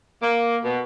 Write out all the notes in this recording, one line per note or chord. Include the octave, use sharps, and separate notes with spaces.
A#3
B2